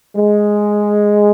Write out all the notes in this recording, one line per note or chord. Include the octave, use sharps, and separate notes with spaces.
G#3